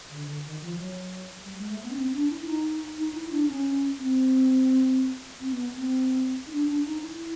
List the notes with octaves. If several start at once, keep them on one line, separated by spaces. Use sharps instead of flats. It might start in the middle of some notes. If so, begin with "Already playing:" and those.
D3
D3
D#3
F3
F#3
G3
G#3
A3
B3
C#4
C4
D4
E4
D#4
D#4
E4
D4
C#4
C4
C4
B3
C4
D#4
D4
D4
D#4
E4